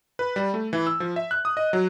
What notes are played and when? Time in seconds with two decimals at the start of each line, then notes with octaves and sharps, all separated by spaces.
0.19 B4
0.36 G3
0.54 A3
0.73 E3
0.87 E6
1.00 F3
1.16 E5
1.31 F#6
1.45 D#6
1.57 D#5
1.73 F#3